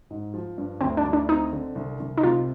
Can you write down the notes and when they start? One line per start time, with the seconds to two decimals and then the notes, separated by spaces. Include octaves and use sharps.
0.10 G#2
0.34 F3
0.58 G2
0.81 D2 C4
0.97 D4
1.04 D2
1.13 D4
1.29 C4 D#4
1.53 D3
1.75 C2
2.00 C2
2.18 D#4
2.23 C3 F4